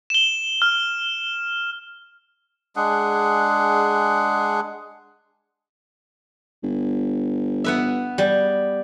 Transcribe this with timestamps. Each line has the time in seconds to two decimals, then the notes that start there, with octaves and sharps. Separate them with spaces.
0.10 E7 G7
0.62 F6
2.76 G#3 D4 G#4 F#5
6.63 G1
7.64 B3 B4 E5
8.18 G3